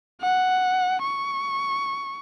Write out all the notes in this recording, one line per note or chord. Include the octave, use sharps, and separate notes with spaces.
F#5
C#6